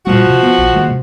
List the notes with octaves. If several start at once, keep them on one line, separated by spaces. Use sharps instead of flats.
A#2 F3 G3 F#4
C3
B3
A#1
D#3 G#3 A#3
C3